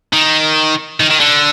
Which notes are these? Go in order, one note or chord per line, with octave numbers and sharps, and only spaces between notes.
D#3
D#3
D#3
D3